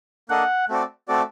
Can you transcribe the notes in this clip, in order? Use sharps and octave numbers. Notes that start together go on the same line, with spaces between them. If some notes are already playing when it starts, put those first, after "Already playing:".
A#3 D4 A4 D#5 F#5
A3 C4 F#4 A4 D5
A3 C4 F#4 A4 D5